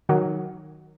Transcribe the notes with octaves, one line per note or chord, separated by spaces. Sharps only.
D#3 F#3